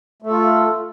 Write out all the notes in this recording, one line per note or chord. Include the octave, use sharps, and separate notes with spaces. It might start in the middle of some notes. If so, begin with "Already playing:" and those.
A3 F4 A4